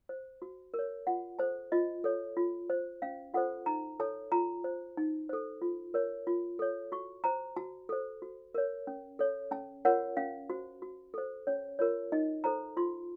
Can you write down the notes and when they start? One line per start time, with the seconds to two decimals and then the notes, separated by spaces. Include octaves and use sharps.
0.09 C5
0.42 F#4
0.74 A#4
0.79 C#5
1.07 F4 F#5
1.39 A4 C5 A5
1.72 F4 D#5
2.04 A4 C#5
2.37 F4
2.70 C5
3.02 C#4 F5
3.34 F4 A4 C5 F#5
3.66 D#4 A#5
4.00 A4 C#5 A5
4.32 F4 A#5
4.64 C5
4.97 D#4
5.29 A4 C5
5.62 F4
5.94 A#4 C#5
6.27 F4
6.59 A4 C#5
6.92 F#4 C#6
7.24 C5 A#5
7.56 F#4 A5
7.89 A4 C5
8.22 F#4
8.54 A#4 C#5
8.87 C#4
9.19 A4 C#5
9.51 C#4 A5
9.85 F4 A#4 C#5 F#5
10.17 C#4 F5
10.50 F#4 C5
10.82 F#4
11.14 A4 C5
11.47 C#4 C#5
11.79 F4 A#4 C#5
12.12 D#4 D#5
12.44 A4 C5 A#5
12.77 F4 C6